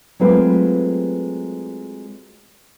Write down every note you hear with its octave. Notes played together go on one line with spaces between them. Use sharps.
F#3 G#3 A3 C4 F4 B4